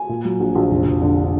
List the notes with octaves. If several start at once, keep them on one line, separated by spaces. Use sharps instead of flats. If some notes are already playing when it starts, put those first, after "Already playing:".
Already playing: G#5
A#2
F#3
A#1
A#1
F1
F1
D3